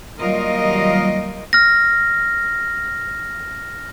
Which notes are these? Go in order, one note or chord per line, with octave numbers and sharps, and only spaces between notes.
D#2 F#3 G3 F4 A#4 D#5
F6 A#6